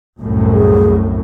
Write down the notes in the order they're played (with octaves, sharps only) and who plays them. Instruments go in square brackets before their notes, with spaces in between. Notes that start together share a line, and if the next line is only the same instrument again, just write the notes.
[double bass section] C2 F#2 A2
[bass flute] G#4